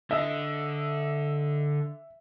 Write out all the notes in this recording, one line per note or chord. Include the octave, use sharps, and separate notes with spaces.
D3 D#5 E5